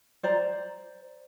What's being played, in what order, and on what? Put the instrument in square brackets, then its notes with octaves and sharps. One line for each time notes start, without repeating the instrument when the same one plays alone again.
[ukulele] C5 D5 A#5